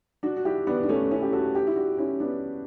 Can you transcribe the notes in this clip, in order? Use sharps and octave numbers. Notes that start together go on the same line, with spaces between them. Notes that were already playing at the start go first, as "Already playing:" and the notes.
D4 F#4
F#4
E4 G4
B3 D4
D4
A3 C#4
C#4 E4
G4
F#4 A4
E4 G4
E4
D4 F#4
C#4 E4
B3 D4